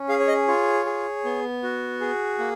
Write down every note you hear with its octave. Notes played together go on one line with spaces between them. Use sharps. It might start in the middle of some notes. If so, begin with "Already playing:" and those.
Already playing: C#4
G#4 F5
C#5
D#5
F4 C#5
G#4
B3
F#4
G#4
A#3